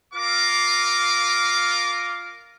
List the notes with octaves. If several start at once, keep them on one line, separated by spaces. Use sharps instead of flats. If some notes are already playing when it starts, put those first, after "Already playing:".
F4 A#4 F5 D6